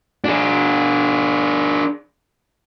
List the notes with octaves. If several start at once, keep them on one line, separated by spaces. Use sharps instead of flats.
D4 G#4